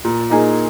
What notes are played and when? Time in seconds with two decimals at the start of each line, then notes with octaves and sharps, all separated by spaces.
0.04 A#2
0.30 A#3 D#4 G#4